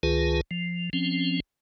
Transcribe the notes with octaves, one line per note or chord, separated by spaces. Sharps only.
C#2 D#3 F4 G#4 B4 A5
F3
F3 C4 C#4